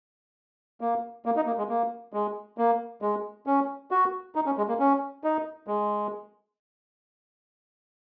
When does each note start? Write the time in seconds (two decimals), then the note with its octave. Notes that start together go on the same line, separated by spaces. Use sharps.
0.81 A#3
1.26 A#3
1.36 D#4
1.47 A#3
1.58 G#3
1.69 A#3
2.13 G#3
2.58 A#3
3.02 G#3
3.47 C#4
3.91 F#4
4.35 D#4
4.46 C#4
4.57 G#3
4.69 A#3
4.80 C#4
5.24 D#4
5.67 G#3